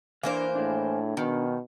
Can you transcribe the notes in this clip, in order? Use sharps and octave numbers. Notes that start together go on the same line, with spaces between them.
E3 A#3 D4 C5 F5
A2 D4 G#4
B2 D#3